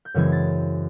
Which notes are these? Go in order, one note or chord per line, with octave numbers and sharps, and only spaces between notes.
G6
F#2 C#3 E3 G#3 C4 G#6
A6